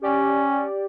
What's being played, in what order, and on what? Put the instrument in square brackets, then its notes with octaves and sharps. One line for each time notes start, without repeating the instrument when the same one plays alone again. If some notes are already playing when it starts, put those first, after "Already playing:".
[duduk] C#4 [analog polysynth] G4 D5